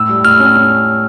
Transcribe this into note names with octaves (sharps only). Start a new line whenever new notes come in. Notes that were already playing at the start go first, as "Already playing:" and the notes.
Already playing: A2 E6
G3
A2 F6
C#4
C#4